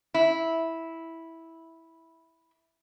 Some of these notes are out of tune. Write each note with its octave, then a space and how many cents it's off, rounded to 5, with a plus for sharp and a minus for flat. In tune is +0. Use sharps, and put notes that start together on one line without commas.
E4 -10